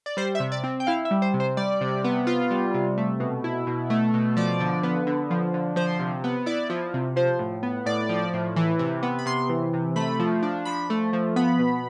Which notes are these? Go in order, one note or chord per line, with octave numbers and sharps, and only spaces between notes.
D5
G3 C5
E5
C3
D5
C4
G5
E4 F5
E5
G3
C5
C3
C5
G3 D5
C3
B3
F4
G3
C3
A3
B2
E4
B2
A3
B2
F3 D5
D3
B3
D3
F3
D3
F3 C5
C3
B3
E4 D5
F3
C3
F3 C5
A2
B3
A2 D5
F3
A2
E3
C3
B3
B5
C3 C6
E3
C3
A3 B5
F3
D4
F3 B5
A3
F3
B3 B5
B2